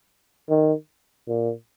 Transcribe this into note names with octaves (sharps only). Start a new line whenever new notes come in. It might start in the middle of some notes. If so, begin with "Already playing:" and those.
D#3
A#2